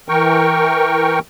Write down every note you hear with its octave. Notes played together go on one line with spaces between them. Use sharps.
E3 A#4 G5 C#6